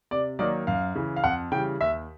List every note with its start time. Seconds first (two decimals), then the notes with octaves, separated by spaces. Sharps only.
0.11 C3 D5
0.39 D#3 F#3 A#3 D#4 D5
0.67 F#2 F5
0.95 C#3 E3
1.16 F5
1.24 F2 F#5
1.52 C#3 E3 G3 G5
1.81 D#2 E5